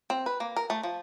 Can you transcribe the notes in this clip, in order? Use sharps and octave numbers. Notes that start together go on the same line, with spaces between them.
C4
B4
A#3
A#4
A3
F3